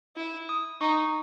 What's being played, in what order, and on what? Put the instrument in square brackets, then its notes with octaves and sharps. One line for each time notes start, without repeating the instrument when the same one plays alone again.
[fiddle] E4
[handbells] D#6
[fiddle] D#4 [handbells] C#6